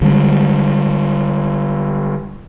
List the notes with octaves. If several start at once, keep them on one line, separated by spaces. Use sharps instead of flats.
D3 G3 G#3